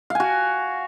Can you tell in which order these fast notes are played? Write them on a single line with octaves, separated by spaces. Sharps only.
F5 G#5 F#4